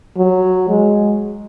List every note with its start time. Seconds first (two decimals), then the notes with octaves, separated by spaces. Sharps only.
0.17 F#3
0.69 G#3